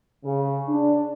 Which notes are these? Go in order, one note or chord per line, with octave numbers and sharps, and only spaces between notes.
C#3
D4